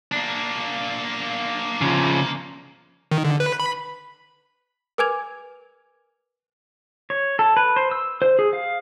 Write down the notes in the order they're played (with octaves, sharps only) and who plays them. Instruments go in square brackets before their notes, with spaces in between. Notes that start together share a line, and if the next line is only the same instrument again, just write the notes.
[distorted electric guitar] A#3 D4
[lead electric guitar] C#3 F3
[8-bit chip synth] D#3
D3
B4
B5
[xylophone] A#4 B4 G#5 D6 G#6 F7
[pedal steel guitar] C#5
A4
B4
C5
E6
C5
G#4
F5